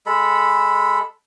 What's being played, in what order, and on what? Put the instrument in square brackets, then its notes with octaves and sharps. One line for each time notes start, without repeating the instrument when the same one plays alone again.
[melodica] G#3 A4 B5